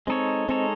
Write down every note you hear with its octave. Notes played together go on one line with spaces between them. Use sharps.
G#3 C4 D#4 A4 C#5
G#3 C4 D#4 A4 C#5